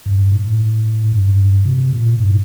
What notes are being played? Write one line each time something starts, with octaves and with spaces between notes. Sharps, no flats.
G2
A2
G2
C3
A#2
G2